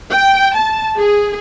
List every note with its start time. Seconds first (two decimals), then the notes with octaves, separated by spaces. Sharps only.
0.10 G5
0.55 A5
0.97 G#4